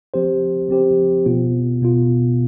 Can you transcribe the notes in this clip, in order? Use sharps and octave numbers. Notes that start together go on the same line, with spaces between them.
F3 C4 G4 C5
F3 C4 G4 C5
B2 B3 F4
B2 B3 F4